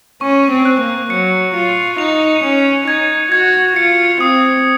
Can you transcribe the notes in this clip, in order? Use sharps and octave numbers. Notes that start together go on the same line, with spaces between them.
C#4 C#6
C4
F#6
A#3
F#3 C#7
F4 C#7
D#4 F7
C#4 C#7
D#4 G#6
F#4 G#6
F4 C#7
C4 D#6